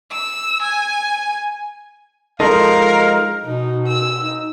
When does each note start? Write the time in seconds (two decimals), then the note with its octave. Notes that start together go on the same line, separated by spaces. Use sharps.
0.12 E6
0.62 G#5
2.40 F3 G#3 D#4 A4 A#4 D#5 F5 C6
3.45 B2 D#4
3.87 E6
4.22 D#4